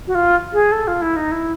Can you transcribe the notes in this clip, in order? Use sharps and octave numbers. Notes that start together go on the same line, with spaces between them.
F#4
F4
G#4
A4
F4
E4
D#4
E4